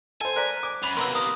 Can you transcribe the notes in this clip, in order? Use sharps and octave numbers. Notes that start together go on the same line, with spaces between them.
A4 C5 G#5
A#4 C5 D5 F#6 B6
D6
F#2 B5 F7
C3 A#3 B3 A#4 C6 E6
A#4 D#6